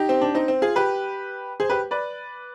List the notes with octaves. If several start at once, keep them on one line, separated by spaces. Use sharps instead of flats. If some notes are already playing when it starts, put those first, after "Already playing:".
Already playing: D#4 G4
C4
D4
C4 D#4
C4
F4 G#4
G4 B4
G#4 C5
G4 B4
B4 D5